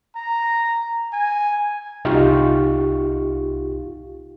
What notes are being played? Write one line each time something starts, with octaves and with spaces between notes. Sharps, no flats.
A#5
G#5
C2 D#4 F4 G4 F5 C#6